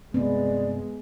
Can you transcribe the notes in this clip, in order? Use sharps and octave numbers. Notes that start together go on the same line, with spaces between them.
G2 C3 G#3 B3 C4 D5